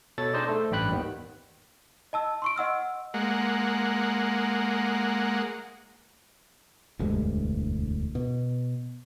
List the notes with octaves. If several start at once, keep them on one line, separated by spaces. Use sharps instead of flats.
B2 A4 C#5 A6
D4 D#4 G#4 C5 D5 D#5
A3 A4 C5
A1 G2 D5 G5 B5 F#6
D#2 D#3 B3
D#5 A5 E6
C6 C#6 D7
D#5 F#5 E6 F6
G#3 A#3 F#5
E1 D2 G2 G#3
B2